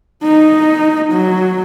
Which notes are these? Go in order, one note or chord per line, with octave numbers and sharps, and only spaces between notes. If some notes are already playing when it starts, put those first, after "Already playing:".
D#4
F#3